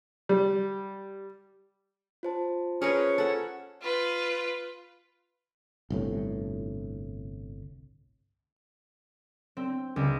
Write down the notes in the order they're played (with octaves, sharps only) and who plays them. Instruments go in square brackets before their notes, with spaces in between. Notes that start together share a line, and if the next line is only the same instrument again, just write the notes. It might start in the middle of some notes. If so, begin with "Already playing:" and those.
[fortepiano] G3
[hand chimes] F4 C5 A5
[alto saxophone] C#4 [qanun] G#4 A#4 B4
[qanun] A4 F#5
[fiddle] F4 B4
[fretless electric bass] G1 C2 A2
[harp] C4
C#2